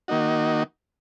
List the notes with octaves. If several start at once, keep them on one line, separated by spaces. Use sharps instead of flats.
D#3 A#3 D#4 F#4